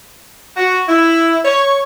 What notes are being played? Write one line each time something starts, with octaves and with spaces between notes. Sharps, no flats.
F#4
E4
C#5